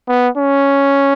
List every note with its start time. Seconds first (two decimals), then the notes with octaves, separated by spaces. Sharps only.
0.08 B3
0.37 C#4